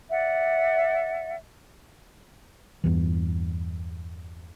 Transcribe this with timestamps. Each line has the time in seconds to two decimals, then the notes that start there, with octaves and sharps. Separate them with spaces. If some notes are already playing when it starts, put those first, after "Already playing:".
0.11 D5 E5 F#5
2.84 E2 G2 E3